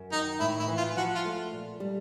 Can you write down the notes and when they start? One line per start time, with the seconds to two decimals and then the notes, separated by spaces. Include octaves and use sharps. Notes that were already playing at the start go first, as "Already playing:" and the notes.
Already playing: F#2
0.12 D#3 D#4
0.40 A2 E4
0.59 E4
0.68 E3
0.77 F4
0.96 F3 F#4
1.15 F4
1.25 A3
1.52 A#2
1.80 G3